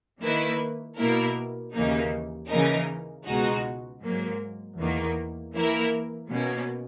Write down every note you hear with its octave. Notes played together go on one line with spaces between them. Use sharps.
D#3 A#3 E4 B4
B2 A#3 E4 A#4
D#2 C#3 E3 A#3 D#4
C#3 E3 A#3 D#4 A#4
C#2 B2 G#3 D#4 F#4
G#2 F#3 A#3
E2 D#3 A#3
E3 A#3 E4 A#4
B2 A#3 C#4